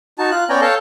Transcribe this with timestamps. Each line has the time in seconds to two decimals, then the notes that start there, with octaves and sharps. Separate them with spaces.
0.19 D#4 F#4 A5
0.31 F4 F#6
0.49 B3 C#4 D5 G5 G#5 A#5
0.61 A4 C#5 F5 G5 A5